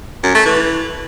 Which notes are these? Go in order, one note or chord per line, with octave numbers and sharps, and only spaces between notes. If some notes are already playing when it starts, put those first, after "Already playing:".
F#2
A3
E3